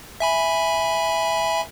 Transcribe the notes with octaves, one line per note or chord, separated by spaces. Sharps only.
E5 G#5 B5